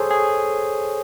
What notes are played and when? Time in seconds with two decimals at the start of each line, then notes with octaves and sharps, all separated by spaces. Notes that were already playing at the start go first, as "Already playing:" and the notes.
Already playing: G#4 A4 C5 C#5
0.11 G#4